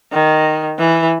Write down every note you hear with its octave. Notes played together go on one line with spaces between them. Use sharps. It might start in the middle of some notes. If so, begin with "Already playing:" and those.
D#3
E3